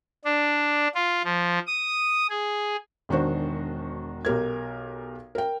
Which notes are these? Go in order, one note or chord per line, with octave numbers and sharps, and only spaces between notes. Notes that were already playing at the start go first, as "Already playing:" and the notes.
D4
F4
F3
D#6
G#4
E1 D#3 D4 F#4 C5
B1 G4 A#4 G#6
A#4 G5